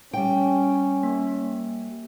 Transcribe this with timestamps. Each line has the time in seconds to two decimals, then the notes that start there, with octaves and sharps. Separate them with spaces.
0.13 G3 C#4 G5
1.03 A#3